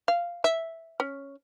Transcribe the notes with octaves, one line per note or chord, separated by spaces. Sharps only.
F5
E5
C#4